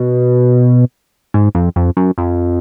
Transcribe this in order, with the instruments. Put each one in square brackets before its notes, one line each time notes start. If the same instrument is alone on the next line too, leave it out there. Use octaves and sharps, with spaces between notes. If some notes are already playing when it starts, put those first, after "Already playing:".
Already playing: [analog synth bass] B2
G#2
F2
F2
F#2
F2